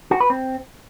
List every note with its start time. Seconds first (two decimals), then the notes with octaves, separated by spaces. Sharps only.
0.11 F#4
0.20 B4
0.30 C4